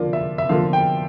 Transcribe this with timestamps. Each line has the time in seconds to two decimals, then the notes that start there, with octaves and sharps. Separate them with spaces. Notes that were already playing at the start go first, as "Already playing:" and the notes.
Already playing: D3 F3 A#3 F4 D5
0.13 E5
0.38 E5
0.49 D3 F3 A#3 F4 F5
0.73 G5